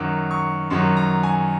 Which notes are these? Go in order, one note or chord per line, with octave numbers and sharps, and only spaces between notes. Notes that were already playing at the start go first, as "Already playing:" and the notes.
Already playing: F#2 D#3 F#3 D6
C#6
F#2 D#3 F#3 C6
A#5
G#5